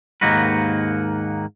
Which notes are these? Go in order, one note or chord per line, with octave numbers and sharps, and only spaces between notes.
D#2 G#2 A#3 D#4 F#4 B4